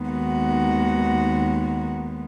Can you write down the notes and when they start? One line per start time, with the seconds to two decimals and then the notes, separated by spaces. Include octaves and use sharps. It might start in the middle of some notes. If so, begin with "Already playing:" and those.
Already playing: D#2 D#3 G#3 B3
0.11 F#4